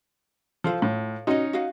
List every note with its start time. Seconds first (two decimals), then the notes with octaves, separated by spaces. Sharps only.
0.64 F3 F4 A4 F5
0.82 A2
1.27 C#4 D#4 F#4 D#5
1.53 F#4 D#5 F5